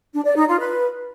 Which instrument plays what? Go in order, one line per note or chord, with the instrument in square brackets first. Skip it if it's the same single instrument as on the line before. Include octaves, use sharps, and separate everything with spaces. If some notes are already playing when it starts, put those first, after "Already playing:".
[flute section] D4
D5
D#4
F4
B4